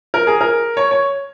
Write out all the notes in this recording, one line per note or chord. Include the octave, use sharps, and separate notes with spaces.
A#4
G#4
A#4
C#5
C#5